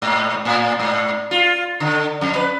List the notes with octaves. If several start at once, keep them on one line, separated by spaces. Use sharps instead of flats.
G#2
A2
G#2
F4
D3
F2
B4